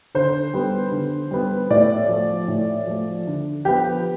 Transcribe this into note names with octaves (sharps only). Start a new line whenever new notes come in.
D3 C5
G3 B3
D3
G3 B3
A2 D5
F3 A3
A2
F3 A3
D3
F3 B3 G4